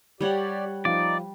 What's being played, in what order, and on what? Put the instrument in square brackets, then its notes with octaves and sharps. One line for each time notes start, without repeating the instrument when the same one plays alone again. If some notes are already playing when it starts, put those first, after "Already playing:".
[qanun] G3 C#5 F#5 [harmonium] G4 D5
[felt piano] F3 [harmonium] D#4 [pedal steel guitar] D5